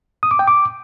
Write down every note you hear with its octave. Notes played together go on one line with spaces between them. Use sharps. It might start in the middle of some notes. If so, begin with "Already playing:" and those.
D#6
D6
G5
D6